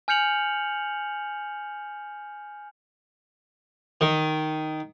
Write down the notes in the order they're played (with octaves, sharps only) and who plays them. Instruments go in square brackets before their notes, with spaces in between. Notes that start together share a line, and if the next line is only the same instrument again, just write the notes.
[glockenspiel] G#5 F6 G6 C#7 F7 F#7
[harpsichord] D#3